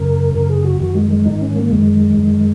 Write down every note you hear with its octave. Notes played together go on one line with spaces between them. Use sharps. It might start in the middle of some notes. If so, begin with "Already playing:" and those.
Already playing: F#2 C#3 A#4
F#2 C#3 A#4
G#4
F#4
F#2 D#3 F#4
G#3
G#3
G#2 D#3 D#4
C#4
A#3
F#2 D#3 G#3
F#2 D#3